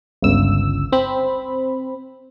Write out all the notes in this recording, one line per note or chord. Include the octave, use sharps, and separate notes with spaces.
G1 C#2 E6
C4 B5